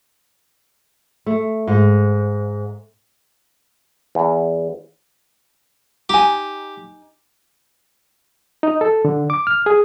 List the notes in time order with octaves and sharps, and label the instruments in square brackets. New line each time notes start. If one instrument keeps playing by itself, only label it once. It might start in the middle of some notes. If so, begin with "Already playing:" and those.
[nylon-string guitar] A3
G#2
[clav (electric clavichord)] E2
[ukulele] D#4 G#5 [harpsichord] G4
[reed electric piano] D#4
A4
D3
D6
F6
G#4